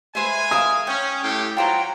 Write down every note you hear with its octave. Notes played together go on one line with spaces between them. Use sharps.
G#3 B4 C5 E5 G#5
A#4 E5 F5 D#6
C#4 G5
A2 G4
F#3 F4 C5 G5 A#5